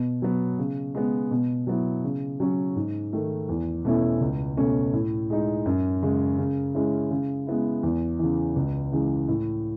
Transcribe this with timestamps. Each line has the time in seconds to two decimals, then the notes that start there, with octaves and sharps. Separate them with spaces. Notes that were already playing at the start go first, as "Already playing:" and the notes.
Already playing: B2
0.22 F#3 B3
0.59 C#3
0.95 G#3 B3
1.31 B2
1.67 F#3 B3 E4
2.04 C#3
2.40 F#3 C#4
2.76 G#2
3.13 D#3 A3
3.49 E2
3.85 B2 A3 C#4 E4
4.21 C#2
4.57 B2 A3 C#4
4.93 A2
5.30 G#3 D#4
5.66 F#2
6.02 C#3 G#3
6.38 C#3
6.75 G#3 C#4 E4
7.11 C#3
7.47 G#3 B3 E4
7.83 E2
8.19 C#3 E3
8.56 C#2
8.92 C#3 E3 G#3
9.28 A2